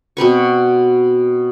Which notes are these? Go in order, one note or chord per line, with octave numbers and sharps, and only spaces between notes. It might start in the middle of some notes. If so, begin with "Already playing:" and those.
B2 C4 B4 C#6